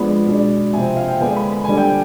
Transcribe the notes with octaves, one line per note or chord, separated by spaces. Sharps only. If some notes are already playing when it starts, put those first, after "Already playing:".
Already playing: F3 G#3 B3 D4 B5
B2 G#3 D4
C3 F3 C4 G#5
F5
G5
D3 G#3 B3 D4 G#5
B5
B5
D3 G3 D4 G#5
G5